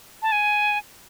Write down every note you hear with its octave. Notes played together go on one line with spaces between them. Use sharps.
A5
G#5